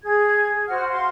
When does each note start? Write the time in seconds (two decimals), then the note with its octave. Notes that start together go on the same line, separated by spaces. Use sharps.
0.03 G#4 G#6
0.67 F#4 C5 F#5 F6
0.89 F5 C6